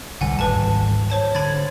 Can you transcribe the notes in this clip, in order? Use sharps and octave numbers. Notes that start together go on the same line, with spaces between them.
C2 G2 D3 F#5 G#5
D1 G#1 G3 B4 A5
C5 C#5 A5
D3 B5 G#6 A6